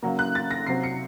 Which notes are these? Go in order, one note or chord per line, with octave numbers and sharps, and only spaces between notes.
C#3 F#3 A#3
F#6
A6
A#6
C3 F#3 C4 C7
C#7